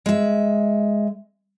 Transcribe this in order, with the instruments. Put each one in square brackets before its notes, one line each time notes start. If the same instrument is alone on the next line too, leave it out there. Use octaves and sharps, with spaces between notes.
[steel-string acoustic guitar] G#3 E5